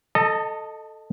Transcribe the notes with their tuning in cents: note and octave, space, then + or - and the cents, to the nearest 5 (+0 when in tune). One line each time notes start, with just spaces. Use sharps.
A4 +0 D#5 -10 A5 +35